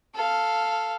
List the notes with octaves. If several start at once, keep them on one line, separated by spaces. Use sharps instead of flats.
A4 F5